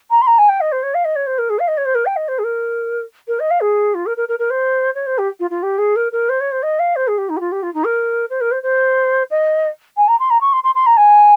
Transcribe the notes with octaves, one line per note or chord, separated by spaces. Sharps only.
A#5
C6
A#5
G#5
G5
D#5
C5
C#5
F5
D#5
C#5
C5
A#4
G#4
F5
D#5
C#5
C5
A#4
G5
D#5
C5
G#4
A#4
A#4
D#5
F5
G#4
F4
A#4
A#4
A#4
A#4
C5
C#5
C5
G4
F4
F4
G4
G#4
A#4
A#4
C5
C#5
C5
D#5
F5
C5
G#4
G4
D#4
G4
F4
G4
F4
D#4
A#4
C5
A#4
C5
C5
D#5
G#5
A#5
C6
A#5
C#6
C6
C6
C6
A#5
G#5